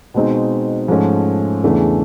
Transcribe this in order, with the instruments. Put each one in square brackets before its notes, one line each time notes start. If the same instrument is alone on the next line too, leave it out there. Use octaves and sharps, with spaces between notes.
[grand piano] B2 G#3 C4 D#4
G#2 F3 A3 C#4
E2 C#3 E3 A3 D4